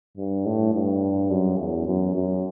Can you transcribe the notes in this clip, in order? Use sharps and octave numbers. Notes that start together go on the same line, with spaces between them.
G2
A2
G2
F#2
E2
F#2
F#2